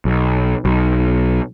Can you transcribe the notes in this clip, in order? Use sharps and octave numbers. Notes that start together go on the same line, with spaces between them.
B1
B1